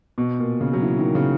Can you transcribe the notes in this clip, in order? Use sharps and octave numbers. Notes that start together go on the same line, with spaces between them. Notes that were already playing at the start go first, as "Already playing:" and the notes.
B2
A#2
C#3
F#3
E3
D#3
C#3